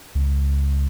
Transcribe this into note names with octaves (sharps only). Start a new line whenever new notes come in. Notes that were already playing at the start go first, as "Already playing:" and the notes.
C#2